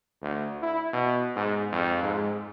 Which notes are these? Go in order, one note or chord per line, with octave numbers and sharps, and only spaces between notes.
D2
E4
B2
G#2
F2
G#2